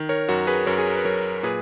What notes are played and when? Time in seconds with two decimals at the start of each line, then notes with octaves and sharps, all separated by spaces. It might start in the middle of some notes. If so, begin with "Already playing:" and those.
Already playing: D#3
0.09 A#4 C#5
0.29 F#2 F#4 A#4
0.47 G#4 B4
0.67 F#2 A#4 C#5
0.78 G#4
0.87 A#4
0.96 B4
1.05 F#3 A#4 C#5
1.43 A#2 G#4 B4